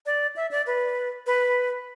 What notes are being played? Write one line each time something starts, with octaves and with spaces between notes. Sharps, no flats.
D5
E5
D5
B4
B4